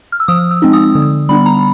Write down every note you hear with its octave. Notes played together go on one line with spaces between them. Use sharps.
F6
E6
F3 D#6
E6
G#3 C4 D#4
D#6
D3
G3 B3 D4 B5
A#5